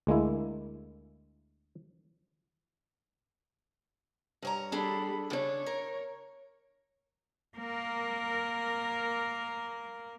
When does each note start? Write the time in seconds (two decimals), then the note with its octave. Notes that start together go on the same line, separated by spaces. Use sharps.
0.07 D2 G#3 A#3 E4
4.42 G2 C#5 A#5
4.72 G3 D4 G#4 A4 B5
5.30 C#3 D4 C#5
5.66 A#4
7.58 A#3 A#4